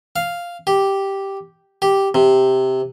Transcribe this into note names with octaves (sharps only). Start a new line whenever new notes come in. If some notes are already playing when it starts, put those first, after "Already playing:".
F5
G4
G4
C3